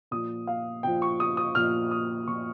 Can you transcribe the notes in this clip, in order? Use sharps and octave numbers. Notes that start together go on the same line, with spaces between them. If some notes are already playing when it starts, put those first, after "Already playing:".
A#2 F3 D#6
F5
A#2 F3 G5
C#6
D#6
D#6
A#2 F3 F6
D#6
A#2 F3 C#6